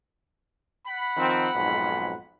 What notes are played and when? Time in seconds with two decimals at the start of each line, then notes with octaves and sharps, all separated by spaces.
0.87 F#5 B5
1.17 D#3 F3 C4
1.55 B1 F2 G#2